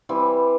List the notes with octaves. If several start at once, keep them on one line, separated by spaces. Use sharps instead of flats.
E3 G3 C4 G4